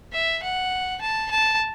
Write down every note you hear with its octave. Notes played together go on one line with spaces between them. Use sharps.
E5
F#5
A5
A5